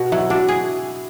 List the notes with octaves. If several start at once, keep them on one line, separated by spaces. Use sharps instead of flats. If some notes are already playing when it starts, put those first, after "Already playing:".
Already playing: B2 F#4
F#3 E4
D4 F#4
G#4